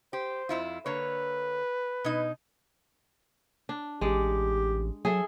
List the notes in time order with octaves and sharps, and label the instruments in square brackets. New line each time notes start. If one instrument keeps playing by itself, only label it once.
[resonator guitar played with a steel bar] G4 [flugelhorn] C5
[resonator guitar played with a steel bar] F2 E4 F4
[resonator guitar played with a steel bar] D3 A#3 C#5 [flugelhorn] B4
[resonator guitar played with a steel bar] B2 D#4
[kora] D4
[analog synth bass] A1 [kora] G#3 D5 [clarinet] G4
[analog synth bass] F#3 [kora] G#4 A4 E5